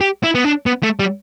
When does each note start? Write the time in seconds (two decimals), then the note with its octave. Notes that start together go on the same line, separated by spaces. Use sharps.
0.01 G4
0.24 E4
0.35 B3
0.44 D4
0.66 B3
0.83 A3
0.99 G3